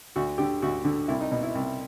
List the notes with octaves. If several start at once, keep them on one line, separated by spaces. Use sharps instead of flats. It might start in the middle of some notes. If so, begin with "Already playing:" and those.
D2 F#4
D3 G4
D2 F#4
D3
C2 E4
D#4
B2
E4
C2